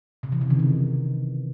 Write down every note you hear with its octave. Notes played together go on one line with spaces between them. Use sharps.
C3
E3
C#3
D#3
E3